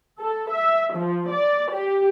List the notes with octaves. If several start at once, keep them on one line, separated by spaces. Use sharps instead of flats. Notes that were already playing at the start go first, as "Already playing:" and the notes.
A4
E5
F3
D5
G4